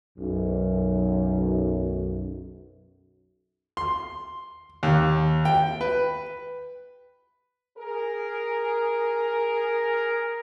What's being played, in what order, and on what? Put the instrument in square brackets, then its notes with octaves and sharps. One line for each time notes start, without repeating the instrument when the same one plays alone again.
[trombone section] B1 F#2
[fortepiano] C6
D#2
G5
B4
[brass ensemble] G#4 A#4